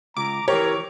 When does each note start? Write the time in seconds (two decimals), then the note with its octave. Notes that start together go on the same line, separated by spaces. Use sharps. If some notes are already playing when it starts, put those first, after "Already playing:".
0.17 C#2 A#5 D6
0.48 E3 G4 A#4 C#5